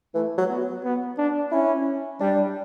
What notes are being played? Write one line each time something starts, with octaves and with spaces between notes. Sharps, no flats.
E3 A3
F#3
B3
B3
D4
C#4 E4
G3 D4